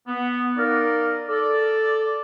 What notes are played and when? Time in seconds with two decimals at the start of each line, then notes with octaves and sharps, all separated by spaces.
0.08 B3
0.57 D#4 A#4 D5 F5
1.29 A4 D5